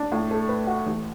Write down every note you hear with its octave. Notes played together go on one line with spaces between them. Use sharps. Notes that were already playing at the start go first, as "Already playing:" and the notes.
Already playing: D4
A2
A3
B4
F#4
A1